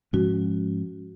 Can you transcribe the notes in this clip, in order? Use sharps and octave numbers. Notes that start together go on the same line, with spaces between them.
G#2 F3 G#3 C#4 F#4